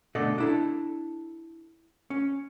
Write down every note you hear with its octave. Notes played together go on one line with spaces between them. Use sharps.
B2 D3 A3 D5 D#5
D4 E4 A4
C#4